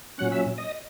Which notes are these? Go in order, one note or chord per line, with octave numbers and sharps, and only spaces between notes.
A#2 F#3 C#4 F#5 F#6
E5 E6
D#5 D#6